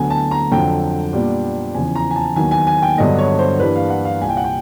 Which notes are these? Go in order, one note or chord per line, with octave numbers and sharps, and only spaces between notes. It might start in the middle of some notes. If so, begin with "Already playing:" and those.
Already playing: D2 D3 F#3 B3 G#5
A5
A#5
F2 D3 F#3 G5
A#2 G3 B3 D4
E2 C#3 F3 G#5
A#5
G#5
A5
D#2 D#3 F#3 B3 G#5
G#5
G#5
G5
G2 D3 F#3 B3 D4 D#5
C#5
C5
G2 E3 G3 A#3 D4 B4
F5
F#5
F5
C2 A#2 G3 G#5
G5
F#5
G5